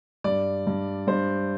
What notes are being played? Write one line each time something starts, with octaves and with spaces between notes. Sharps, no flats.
G2 D5
G2
G2 C5